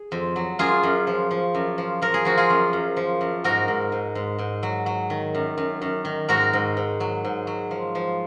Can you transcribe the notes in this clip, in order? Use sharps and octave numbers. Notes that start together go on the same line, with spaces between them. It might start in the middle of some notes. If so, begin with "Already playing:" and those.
Already playing: G#4
F2
F#3
F#2 F4 G#4
F#2
F3
F3
F#2
F3
F3 A#4
G#4
F3 F#4
F4 G#4
F#2
F#2
F3
F#2
G#2 F#4 A#4
G#2
G#2
G#2
G#2
F#3
F#3
D#3
F#2
F#2
F#2
D#3
G#2 F#4 A#4
G#2
G#2
F#3
G#2
F#3
F3
F3